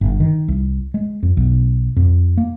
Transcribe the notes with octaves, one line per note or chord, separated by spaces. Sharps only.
G1
D#3
C2
G#3
F2
B1
F2
A#3